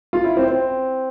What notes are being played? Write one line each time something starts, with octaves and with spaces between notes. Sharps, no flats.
F4
E4
C4
C4